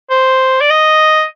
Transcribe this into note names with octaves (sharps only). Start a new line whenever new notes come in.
C5
D5
D#5